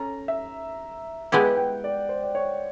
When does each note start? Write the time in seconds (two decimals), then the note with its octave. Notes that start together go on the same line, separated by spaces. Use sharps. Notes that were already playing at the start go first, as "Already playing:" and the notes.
Already playing: C#4 A4 A#5
0.28 E5
1.32 G#3 B3 E4 G4 F#5
1.57 G5
1.84 D5
2.09 C5
2.24 D5
2.35 C#5